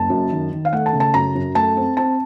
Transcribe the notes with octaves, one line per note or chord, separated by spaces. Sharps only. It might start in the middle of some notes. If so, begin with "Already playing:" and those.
Already playing: F#1 A5
F#2
D#3
D#3
F5
A3 F#5
A5
C#3
A5
F#2 A#5
F#2
A3 A5
C4
C4 A5